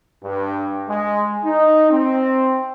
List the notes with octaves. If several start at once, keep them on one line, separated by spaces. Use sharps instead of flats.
G2
G#3
D#4
C4